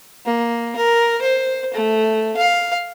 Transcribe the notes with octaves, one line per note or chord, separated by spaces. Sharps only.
A#3
A#4
C5
A3
F5